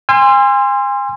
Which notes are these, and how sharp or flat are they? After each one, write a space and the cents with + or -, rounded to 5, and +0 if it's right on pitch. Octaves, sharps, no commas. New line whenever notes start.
G#5 -35 C6 +0 E6 +45